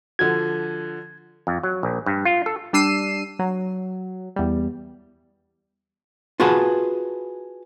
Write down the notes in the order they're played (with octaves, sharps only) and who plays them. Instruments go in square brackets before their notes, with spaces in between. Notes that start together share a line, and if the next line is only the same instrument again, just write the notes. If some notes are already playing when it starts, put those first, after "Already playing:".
[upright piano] D3 F3 F#4 [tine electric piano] G#6
[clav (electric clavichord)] F2
F#3
A#1
G2
F4
A4
[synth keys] G3 D4 E6 C7 D#7 E7
F#3
E2 G3
[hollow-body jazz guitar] F4 F#4 G#4 B4 F#5 A5